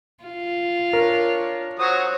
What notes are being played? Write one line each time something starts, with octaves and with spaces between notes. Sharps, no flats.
F4
D4 A#4 C#5
F#3 F#4 C5 C#5 D#6